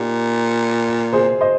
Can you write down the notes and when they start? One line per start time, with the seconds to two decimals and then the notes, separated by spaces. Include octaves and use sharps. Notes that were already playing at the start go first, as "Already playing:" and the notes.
Already playing: A#2 D#4 G4
1.13 G#4 C5
1.41 C5 D#5